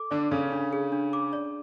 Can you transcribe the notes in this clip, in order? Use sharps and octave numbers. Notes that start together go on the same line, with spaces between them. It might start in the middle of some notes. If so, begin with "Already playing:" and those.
Already playing: A4 D6
D3 D4 D5
C#3 C#4 A4
D4
G#4
D4
D6
D5